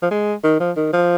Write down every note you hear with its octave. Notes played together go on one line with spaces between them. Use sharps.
F3
G#3
D#3
F3
D#3
F3